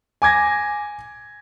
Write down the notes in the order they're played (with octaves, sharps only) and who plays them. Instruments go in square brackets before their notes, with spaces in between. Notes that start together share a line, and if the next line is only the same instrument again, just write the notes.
[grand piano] G#5 D6 G#6 A#6